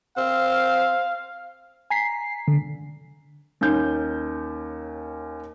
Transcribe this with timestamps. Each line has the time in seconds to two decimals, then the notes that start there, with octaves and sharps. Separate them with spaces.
0.17 C4 F5
1.90 G#5 A#5 B6 C7
2.48 D3
3.61 D#2 C#4 G6